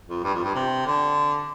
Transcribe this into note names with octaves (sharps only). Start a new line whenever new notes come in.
F2
G2
F2
G2
C3
D3